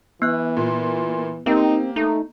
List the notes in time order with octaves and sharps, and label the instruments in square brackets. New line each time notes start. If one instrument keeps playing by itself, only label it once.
[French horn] E3 [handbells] B3 F#6
[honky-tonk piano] A#2
[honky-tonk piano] A#3 G4 [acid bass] C4 [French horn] D#4
[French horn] A3 [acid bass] D#4